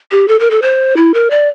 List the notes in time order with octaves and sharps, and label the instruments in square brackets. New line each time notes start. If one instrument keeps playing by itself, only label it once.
[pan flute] G4
A4
A#4
A4
C5
E4
A#4
D5